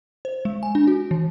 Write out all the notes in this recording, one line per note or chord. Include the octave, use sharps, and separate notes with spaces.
C5
G#3
G#5
D4
F#4
E3